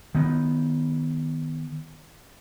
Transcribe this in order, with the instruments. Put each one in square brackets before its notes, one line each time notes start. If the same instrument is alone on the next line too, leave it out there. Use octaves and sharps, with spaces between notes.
[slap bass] D#3 B3